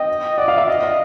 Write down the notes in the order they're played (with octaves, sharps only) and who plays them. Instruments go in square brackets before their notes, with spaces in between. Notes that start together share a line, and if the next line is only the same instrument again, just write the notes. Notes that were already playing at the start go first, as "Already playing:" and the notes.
Already playing: [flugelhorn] D#5 [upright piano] G5
[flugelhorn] D5 [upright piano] F#5
[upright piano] F5
E5
[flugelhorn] D#5 [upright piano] F5
[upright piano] F5